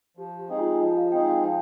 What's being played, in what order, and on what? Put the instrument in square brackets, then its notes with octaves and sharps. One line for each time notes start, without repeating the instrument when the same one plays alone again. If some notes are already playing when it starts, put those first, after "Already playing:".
[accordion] F3 [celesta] G4
[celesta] G4
[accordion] G#3 C4 D#4 G#4
[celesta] F4
[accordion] F3 [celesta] D#5
[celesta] F5
[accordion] G#3 C4 D#4 G#4 [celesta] G5
[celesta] F5
[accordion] F3 [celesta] G5